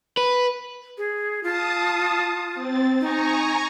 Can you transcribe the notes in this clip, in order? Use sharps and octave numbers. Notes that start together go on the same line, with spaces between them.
B4
G#4
F4 A5 D#6
C4 A6
D#4 G#5 A#5 C#6